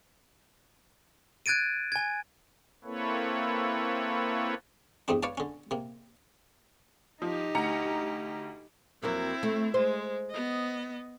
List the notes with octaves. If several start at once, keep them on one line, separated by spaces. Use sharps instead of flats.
F#6 G#6 A6 D7 D#7
G#5 G#6
A#3 C4 E4 A4 B4 C#5
E2 G2 A3 C4 D4
B4 C#5 D5 F5 A5
D3 C#4
C3 A#3
F3 D#4 G4
D2 A#5 C#7
F2 F#3 A#3 C4 E4
A3
G#3 C5
B3 D#5